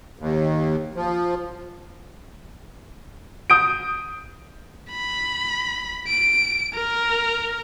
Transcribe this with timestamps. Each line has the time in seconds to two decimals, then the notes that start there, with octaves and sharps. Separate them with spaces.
0.19 D#2
0.96 F3
3.50 D#6 G6 D7
4.91 B5
6.08 D7
6.75 A#4